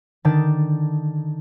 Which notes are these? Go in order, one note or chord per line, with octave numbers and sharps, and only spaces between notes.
D3 D#3 D#4 D5 A5 G6